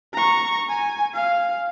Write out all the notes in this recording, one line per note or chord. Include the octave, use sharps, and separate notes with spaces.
A#5 C#6
G#5
F5